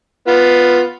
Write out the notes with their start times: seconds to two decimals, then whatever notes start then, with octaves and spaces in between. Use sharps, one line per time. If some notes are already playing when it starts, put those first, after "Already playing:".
0.28 B3 F4